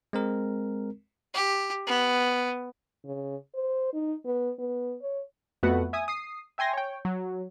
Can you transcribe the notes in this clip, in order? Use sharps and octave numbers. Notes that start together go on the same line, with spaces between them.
G#3 C4 A#4
G4
B3
C#3
C5
D#4
B3
B3
C#5
F2 A3 B3 F#4 B4 F#5
E5 G#5 D#6
D#6 C7
E5 G5 G#5 C6 A#6
C#5 G5
F#3